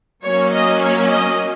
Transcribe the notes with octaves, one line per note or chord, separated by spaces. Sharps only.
F#3 A#3 C#4 C#5
D#5
C#5
D#5